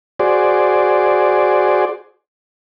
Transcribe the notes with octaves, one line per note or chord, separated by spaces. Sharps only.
F#4 G#4 C5 D5